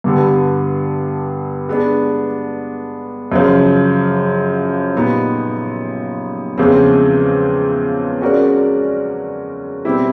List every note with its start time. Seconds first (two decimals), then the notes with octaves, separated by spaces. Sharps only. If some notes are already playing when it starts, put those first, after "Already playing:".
0.04 G2 D3 G3 B3
1.68 G#3 B3 D4
3.32 F#2 C#3 F3
4.95 A#2 G3 B3 D#4
6.58 E2 C#3 F3 G#3 C4
8.22 G#3 C#4 F#4 A#4 D5
9.85 B2 G3 C4 E4 G4